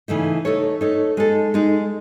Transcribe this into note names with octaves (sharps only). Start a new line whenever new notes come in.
C#3 E3 A3 D#4
A3 D#4 A4 C#5
A3 D#4 A4 C#5
G#3 D#4 A4
G#3 D#4 A4